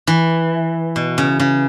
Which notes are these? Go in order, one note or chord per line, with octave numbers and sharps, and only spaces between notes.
E3
B2
C#3
C#3